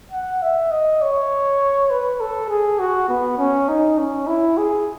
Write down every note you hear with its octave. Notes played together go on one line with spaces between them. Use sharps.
F#5
E5
D#5
C#5
B4
A4
G#4
F#4
B3
C#4
D#4
C#4
E4
G#4